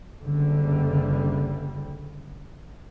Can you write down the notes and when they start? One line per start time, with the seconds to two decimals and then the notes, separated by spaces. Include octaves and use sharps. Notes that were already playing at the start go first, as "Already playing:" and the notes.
0.22 F#1 D3 G3